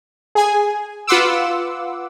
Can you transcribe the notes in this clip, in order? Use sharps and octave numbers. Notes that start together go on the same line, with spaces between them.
G#4 G#5
F4 B4 F#5 C6 D6 E6